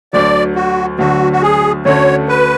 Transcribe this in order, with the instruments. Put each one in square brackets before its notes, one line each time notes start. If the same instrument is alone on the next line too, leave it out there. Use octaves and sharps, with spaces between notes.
[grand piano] D2 D3 F#3 [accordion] D5
[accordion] F#4
[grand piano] D2 D3 F#3 [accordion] F#4
[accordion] F#4
G#4
[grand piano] D2 D3 A3 C#4 F#4 [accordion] C#5
[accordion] B4